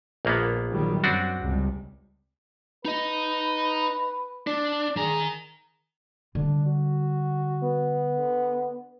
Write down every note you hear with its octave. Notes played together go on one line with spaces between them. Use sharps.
A#1 A#3 B3
D#3 F#3 G3
F#2 C4 D4 F#4
C#2 C3 G3
D#4 B4 D#5
D4 D5
D#3 G#4 A#5
D3 G3 D4
F#4
B3
D3